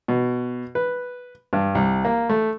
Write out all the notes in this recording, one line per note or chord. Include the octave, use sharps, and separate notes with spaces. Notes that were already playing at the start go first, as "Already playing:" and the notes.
B2
B4
G2
C2
A#3
A3